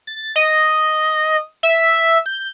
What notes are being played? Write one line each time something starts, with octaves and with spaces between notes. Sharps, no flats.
A6
D#5
E5
G6